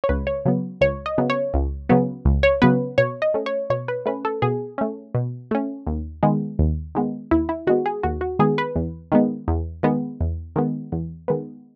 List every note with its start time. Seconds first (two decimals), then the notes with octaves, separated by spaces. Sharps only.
0.04 C#5
0.09 C#2 B4
0.27 C#5
0.45 C#3 F#3 B3
0.81 C#2 C#5
1.06 D#5
1.18 C#3 F#3 B3
1.30 C#5
1.54 C#2
1.89 C#3 F#3 B3
2.25 C#2
2.43 C#5
2.62 C#3 F#3 B3 B4
2.98 B2 C#5
3.22 D#5
3.34 A3 C#4
3.46 C#5
3.70 B2 C#5
3.88 B4
4.06 A3 C#4 B4
4.25 A4
4.42 B2 G#4
4.78 A3 C#4
5.15 B2
5.51 A3 C#4
5.87 D#2
6.23 D#3 G#3 B3
6.59 D#2
6.95 D#3 G#3 B3
7.31 D#2 E4
7.49 E4
7.67 D#3 G#3 B3 F#4
7.86 G#4
8.03 D#2 F#4
8.21 F#4
8.39 D#3 G#3 B3 G#4
8.58 B4
8.76 E2
9.12 D#3 G#3 B3
9.48 E2
9.83 D#3 G#3 B3
10.21 E2
10.56 D#3 G#3 B3
10.92 E2
11.28 D#3 G#3 B3